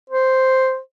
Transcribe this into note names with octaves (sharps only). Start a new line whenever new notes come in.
C5